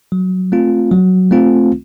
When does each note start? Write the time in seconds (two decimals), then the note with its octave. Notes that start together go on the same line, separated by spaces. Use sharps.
0.12 F#3
0.52 A3 C4 F4
0.91 F#3
1.31 A3 C4 F4